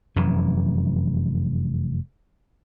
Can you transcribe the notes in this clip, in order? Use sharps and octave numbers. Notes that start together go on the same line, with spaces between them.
F1 F#2 E3